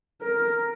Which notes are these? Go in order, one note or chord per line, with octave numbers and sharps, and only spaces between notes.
A#4